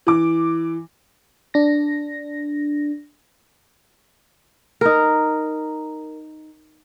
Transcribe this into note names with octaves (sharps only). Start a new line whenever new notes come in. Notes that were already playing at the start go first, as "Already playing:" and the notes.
E3 D6
D4 A#6
D#4 A#4